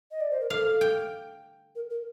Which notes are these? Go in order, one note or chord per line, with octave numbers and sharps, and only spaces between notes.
D#5
D5
C5
A#4
A4 F5
G5
A#4
A#4